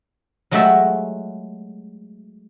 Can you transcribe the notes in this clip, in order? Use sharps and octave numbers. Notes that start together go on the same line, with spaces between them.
F#3 G#3 A3 F#4 G4 E5